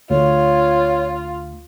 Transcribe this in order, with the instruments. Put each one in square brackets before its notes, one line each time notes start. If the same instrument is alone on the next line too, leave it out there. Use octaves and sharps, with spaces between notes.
[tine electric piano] D2 [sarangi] F4 [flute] C#5